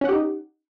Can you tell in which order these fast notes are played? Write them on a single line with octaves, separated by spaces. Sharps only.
C#4 F#5 G4 D#4